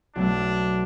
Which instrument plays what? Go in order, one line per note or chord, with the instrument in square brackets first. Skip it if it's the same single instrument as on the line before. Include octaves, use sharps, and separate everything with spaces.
[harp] B1 A3 [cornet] D4